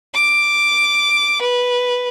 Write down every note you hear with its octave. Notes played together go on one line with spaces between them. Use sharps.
D6
B4